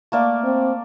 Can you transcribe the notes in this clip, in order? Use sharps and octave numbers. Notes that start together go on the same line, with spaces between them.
A3 A#3 D5
C4